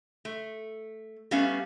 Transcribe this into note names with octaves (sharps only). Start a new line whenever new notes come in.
A3
G3 A3 B3 C#4 F5